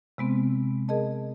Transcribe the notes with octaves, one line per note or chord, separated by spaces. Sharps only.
C3 G#3 B3 C4
G#4 A#4 D#5 A5